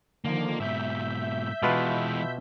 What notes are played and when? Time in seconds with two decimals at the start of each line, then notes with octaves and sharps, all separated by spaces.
0.25 D3 D#3 F3 A#3
0.60 G#2 B2 E5 G6 B6
1.63 B2 E3 G#3 F4 B4